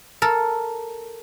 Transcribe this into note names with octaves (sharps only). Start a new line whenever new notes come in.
A4 A#4